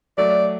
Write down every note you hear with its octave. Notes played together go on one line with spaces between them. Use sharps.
F#3 A3 D5